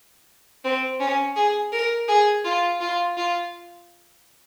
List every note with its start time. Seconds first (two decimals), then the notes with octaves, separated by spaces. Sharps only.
0.64 C4
1.00 C#4
1.36 G#4
1.72 A#4
2.08 G#4
2.45 F4
2.81 F4
3.17 F4